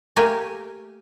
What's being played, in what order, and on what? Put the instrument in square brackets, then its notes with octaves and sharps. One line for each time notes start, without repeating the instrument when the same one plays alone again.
[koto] A3 A#3 G4 A#4 G5 G#5